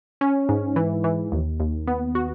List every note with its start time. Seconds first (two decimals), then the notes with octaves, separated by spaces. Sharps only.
0.21 C#4
0.49 G#2
0.76 E3
1.04 E3
1.32 D#2
1.60 D#2
1.87 B3
2.15 F#4